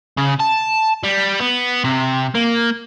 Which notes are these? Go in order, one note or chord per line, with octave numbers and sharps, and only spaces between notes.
C#3
A5
G3
B3
C3
A#3